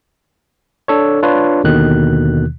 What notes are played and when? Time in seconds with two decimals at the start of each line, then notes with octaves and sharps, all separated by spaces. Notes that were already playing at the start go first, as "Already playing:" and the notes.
0.88 D4 A4 C#5
1.23 D4 F4 B4 C#5
1.64 D#2 B2 D3 D#3 F#6